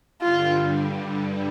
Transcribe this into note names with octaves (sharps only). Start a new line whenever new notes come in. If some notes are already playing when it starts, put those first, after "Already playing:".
G2 D3 G3 F4